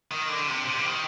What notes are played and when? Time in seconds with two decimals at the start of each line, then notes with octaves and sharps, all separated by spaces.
0.12 D#3
0.29 D3
0.48 C3
0.65 C3
0.79 D3
0.84 D#3